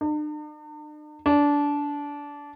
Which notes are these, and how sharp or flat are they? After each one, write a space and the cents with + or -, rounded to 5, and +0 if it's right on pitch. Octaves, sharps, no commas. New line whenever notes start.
D4 +45
D4 -20